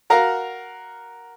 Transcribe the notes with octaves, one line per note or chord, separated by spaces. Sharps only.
F#4 A#4 F5 A#5